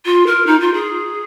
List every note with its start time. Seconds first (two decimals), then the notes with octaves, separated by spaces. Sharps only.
0.05 F4
0.27 A#4
0.46 D#4
0.60 F4
0.74 G#4